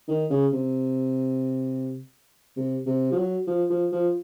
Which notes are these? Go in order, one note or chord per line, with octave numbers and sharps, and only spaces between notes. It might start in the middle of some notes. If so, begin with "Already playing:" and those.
D#3
C#3
C3
C3
C3
F3
F#3
F3
F3
F3